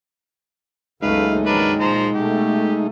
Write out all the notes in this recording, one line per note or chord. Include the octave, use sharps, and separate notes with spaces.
F#1 C#2 G#3 A3 D#4 B4 F5
G2 D#3 F#3 D4 A#4 B4
A#2 F3 C5 A#5
B2 A3 G4